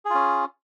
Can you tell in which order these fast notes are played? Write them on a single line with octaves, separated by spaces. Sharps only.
G#4 F4 C#4